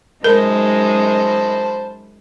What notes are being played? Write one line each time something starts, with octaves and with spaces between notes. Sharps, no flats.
F#2 G#3 D#4 A#4 C5 A5 B5